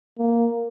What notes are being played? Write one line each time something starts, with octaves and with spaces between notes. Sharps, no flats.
A#3